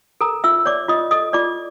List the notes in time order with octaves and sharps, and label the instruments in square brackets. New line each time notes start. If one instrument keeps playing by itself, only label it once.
[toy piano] A4 A#4 A#5
F4 E5 E6
C#5 D5 D6
F4 D#5 D#6
A4 D#5 D#6
F4 D5 D6